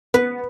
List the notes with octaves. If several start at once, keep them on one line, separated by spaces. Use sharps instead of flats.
B3 B4